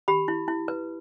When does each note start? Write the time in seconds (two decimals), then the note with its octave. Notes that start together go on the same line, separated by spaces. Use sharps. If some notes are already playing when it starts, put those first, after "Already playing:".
0.08 G4 B5
0.28 E4
0.48 E4
0.68 B4